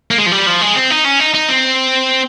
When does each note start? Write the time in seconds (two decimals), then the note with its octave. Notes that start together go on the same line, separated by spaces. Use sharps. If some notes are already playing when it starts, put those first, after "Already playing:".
0.11 A#3
0.18 G#3
0.26 F3
0.32 G3
0.47 F3
0.61 G#3
0.75 C4
0.90 D#4
1.04 C#4
1.19 D#4
1.34 D#4
1.49 C4